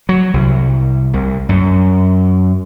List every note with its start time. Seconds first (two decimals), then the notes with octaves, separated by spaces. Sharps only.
0.09 F#3
0.34 C2
1.13 C2
1.49 F#2